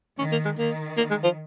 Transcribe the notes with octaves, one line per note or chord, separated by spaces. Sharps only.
D#3 C#4
A#3
G#3
D#3 A#3
A#3
G#3
F3